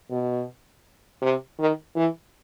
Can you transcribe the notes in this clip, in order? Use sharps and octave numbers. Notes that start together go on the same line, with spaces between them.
B2
C3
D#3
E3